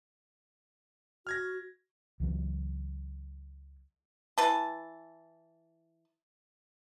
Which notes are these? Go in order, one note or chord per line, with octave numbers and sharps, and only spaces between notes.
F#4 F6 G#6 A#6
C#2 E3 F#3
E3 B4 A5